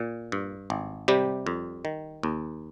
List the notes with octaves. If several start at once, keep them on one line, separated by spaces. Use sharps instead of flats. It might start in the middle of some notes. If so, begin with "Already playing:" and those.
Already playing: A#2
G2
G#1
C3 G3 G4
F2
D#3
D#2